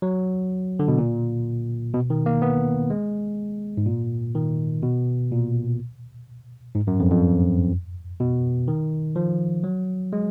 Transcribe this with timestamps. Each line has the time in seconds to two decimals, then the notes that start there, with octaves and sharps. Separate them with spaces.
0.02 F#3
0.79 D3
0.88 B2
0.98 A#2
1.94 B2
2.10 D#3
2.26 A#3
2.42 B3
2.90 G#3
3.77 G#2
3.86 A#2
4.35 D#3
4.83 B2
5.31 A#2
6.75 G#2
6.87 F#2
7.00 F2
7.12 F2
8.20 B2
8.68 D#3
9.16 F3
9.64 F#3
10.13 G#3